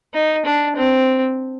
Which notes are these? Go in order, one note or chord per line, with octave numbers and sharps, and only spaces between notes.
D#4
D4
C4